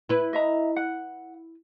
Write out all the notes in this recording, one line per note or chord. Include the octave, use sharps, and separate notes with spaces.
E4 B4
D#5 E5 A#5
F#5